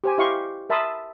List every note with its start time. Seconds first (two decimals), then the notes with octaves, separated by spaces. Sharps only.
0.04 G4 C5 G#5
0.18 E4 G4 D#5 F5 C6 C#6
0.70 A#4 E5 A5 B5 C6 D#6